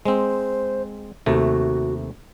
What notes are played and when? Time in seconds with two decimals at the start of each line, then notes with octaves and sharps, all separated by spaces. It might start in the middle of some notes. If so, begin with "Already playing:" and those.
0.05 G#3 C4 C5
1.26 D#2 C3 A3 F#4